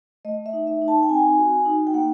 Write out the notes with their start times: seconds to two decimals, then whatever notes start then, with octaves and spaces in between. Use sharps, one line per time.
0.25 A3 D#5
0.46 E5
0.53 D#4
0.67 E5
0.82 D#4
0.88 A5
1.03 G5
1.09 C4 G#5
1.38 F#4
1.66 D#4
1.87 G5
1.94 A#3 F#5